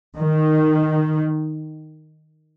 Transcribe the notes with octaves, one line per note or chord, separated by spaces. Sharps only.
D#3